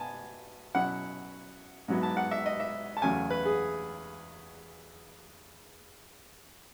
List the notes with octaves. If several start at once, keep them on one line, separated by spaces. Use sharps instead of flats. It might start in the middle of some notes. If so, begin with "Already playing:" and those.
Already playing: B2 B3 G#5 A5
B2 F#3 C#4 E4 F#5
G#2 F#3 B3 E4
A5
F#5
E5
D#5
E5
A5
E2 C#3 F#3 A3 C#4 G#5
B4
G#4